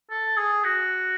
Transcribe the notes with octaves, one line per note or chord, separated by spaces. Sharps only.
A4
G#4
F#4